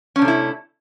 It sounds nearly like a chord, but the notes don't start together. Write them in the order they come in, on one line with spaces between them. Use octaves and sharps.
C#4 D4 C3 A3 E4